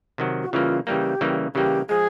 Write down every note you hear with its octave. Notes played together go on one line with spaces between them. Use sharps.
C3 D#3 F#3
F#4
C#3 E3 G3 A#3 F4
C#3 E3 G3 A#3 G4
C#3 E3 G3 A#3
C#3 E3 G3 A#3 G4
F3 G#3 G#4